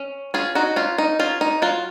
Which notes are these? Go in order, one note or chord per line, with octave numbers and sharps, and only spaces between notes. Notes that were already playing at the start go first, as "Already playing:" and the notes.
Already playing: C#4
C#4 F4 G#4
D#4 F#4
C#4 F4
D#4
C#4 F4
D#4
F#3 F4